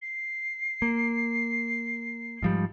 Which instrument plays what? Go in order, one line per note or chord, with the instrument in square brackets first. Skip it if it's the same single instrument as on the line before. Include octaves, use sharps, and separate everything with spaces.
[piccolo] C7
[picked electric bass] A#3
G#2 F3 G3